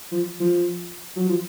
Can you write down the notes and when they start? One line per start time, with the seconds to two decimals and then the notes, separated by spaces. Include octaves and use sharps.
0.11 F3
0.40 F3
1.16 F#3
1.28 F3